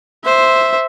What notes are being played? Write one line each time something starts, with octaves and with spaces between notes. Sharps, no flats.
C5 E5